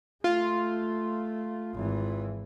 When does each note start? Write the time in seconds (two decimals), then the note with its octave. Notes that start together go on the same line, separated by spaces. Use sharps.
0.24 A3 F4
1.74 G#1 E3